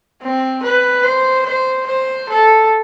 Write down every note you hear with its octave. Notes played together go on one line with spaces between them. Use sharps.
C4
B4
C5
C5
C5
A4